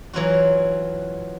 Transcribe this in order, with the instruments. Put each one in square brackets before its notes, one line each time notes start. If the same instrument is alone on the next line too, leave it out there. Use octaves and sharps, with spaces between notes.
[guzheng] E3 F#3 F4 F#4